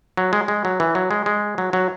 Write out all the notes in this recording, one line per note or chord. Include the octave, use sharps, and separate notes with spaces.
F#3
G#3
G#3
F#3
E3
F#3
G#3
G#3
F#3
F#3